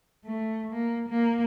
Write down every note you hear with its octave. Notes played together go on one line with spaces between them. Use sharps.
A3
A#3
A#3